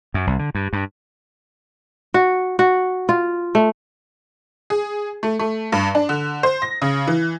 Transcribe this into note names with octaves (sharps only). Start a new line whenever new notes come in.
F#2
C2
D3
G2
G2
F#4
F#4
F4
A3
G#4
A3
A3
G2
D4
D3
C5
A#6
C#3
E3